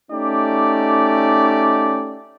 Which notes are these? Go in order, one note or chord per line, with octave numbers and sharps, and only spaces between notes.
A3 C#4 D#4 G4 D5